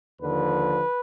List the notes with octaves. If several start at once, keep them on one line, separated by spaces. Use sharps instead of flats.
D#2 D3 F3 B4